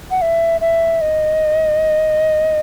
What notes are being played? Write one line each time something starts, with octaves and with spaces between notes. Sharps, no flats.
F#5
E5
E5
D#5